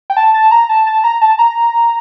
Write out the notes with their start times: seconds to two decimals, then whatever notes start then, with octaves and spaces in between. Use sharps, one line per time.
0.10 G5
0.17 A5
0.34 A5
0.51 A#5
0.69 A5
0.87 A5
1.04 A#5
1.21 A5
1.39 A#5